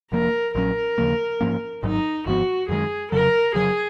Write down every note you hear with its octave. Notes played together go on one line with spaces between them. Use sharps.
F1 F2 F3 A#3 A#4
A#1 A#2 F#3 C#4 A#4
D#2 C#3 F3 A#3
G#2 F3 A#3 C#4
G#1 G#2 F#3 D#4
G#1 G#2 F3 B3 F#4
F#2 D#3 G#3 G#4
F1 F2 C#3 F#3 A#4
F1 F2 C#3 F#3 G#4